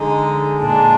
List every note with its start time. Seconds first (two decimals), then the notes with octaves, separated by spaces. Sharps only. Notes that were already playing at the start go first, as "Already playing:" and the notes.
Already playing: D3 G#3 D#4
0.61 A#2 G#3 D4